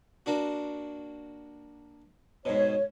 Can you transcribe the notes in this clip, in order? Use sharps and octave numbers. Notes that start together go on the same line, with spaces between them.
A#3 D4 F#4
G#2 B2 C#5